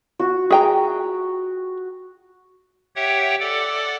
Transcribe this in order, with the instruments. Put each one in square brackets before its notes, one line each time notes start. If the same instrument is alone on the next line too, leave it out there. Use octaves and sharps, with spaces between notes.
[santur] F#4
[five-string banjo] G#4 G5 A#5
[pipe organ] G4 C#5 E5 F#5 G5
A4 D5 F#5 D6